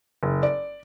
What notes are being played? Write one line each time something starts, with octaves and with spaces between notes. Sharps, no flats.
F#1
D5